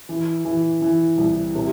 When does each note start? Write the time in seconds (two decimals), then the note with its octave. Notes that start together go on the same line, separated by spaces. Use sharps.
0.09 E3
0.45 E3
0.82 E3
1.18 C2
1.55 C3